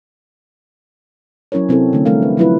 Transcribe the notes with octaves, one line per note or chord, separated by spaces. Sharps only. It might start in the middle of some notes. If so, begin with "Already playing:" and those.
F#3 C#4 E4 A#4 C#5
C3 C4 E4 A4
D3 A3
F3 G3 A3 A#4 F5
B4
F3 F#3 E4 F4 B4